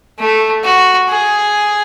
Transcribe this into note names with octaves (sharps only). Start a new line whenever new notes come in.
A3
F#4
G#4